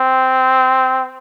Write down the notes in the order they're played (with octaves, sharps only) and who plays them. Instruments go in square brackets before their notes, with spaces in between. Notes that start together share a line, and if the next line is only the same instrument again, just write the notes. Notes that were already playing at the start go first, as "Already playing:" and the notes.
Already playing: [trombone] C4